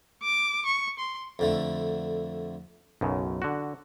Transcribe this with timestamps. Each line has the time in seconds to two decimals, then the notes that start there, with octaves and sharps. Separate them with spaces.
0.23 D6
0.66 C#6
0.99 C6
1.39 F2 D3 A3
3.01 B1 F#2 C#3
3.42 D3 F#4